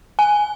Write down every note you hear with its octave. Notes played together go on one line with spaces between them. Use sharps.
G#5